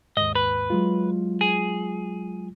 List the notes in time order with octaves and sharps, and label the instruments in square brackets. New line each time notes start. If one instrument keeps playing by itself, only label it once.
[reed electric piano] D#2 G#2 [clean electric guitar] D#5
[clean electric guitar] B4
[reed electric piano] F#3 G#3 F4
[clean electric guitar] G#4